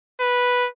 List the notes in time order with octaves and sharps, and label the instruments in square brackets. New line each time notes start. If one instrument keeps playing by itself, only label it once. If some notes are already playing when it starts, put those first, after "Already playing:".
[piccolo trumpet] B4